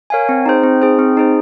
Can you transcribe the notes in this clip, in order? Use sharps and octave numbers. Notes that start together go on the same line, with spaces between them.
A#4 C#5 F5 G#5
C4
D#4 G#4 C5
C4
D#4 G#4 C5
C4
D#4 G#4 C5